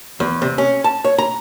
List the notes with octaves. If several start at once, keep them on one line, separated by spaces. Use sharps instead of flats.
E2
C3
C#4
A5
C#5
A#5